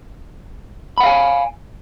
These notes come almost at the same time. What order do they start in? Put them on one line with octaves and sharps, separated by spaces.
B5 F#5 F5 G#5